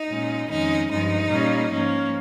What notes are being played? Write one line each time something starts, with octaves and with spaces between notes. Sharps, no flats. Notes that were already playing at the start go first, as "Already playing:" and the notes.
Already playing: D#4
A#2 G#3 C#4
F2 D#3 G#3 C#4 D#4
G2 F3 G#3 D#4
A#2 G3 A#3 C#4
G#2 F3 A#3 C#4